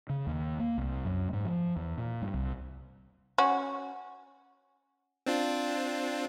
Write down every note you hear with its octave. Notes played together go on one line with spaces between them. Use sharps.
C#3
D#2
A#3
C2
F#2
G#2
F3
E2
A#2
G2
C2
C#4 F#4
C4 D4 F4